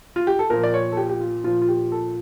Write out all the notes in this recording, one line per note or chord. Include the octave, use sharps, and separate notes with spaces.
F4
G4
A4
A#2 F3 A#4
D5
C#5
A4
G4
G4
F4
A#2 F3 F4
F4
G4
A4